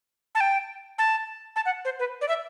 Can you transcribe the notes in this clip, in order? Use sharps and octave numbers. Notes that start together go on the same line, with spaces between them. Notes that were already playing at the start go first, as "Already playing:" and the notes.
A5
G5
A5
A5
F#5
C5
B4
D5
E5